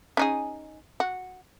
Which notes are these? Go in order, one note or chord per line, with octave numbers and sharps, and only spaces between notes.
C#4 D#4 G#4
F#4